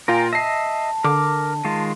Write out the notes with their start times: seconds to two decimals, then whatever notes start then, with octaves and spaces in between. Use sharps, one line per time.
0.08 A#2 F4 A#4 G5 G#5 A#5
0.33 D#5 E5 A5 A#6 C7
1.04 D3 A#4 D6
1.65 D#3 G#3 F4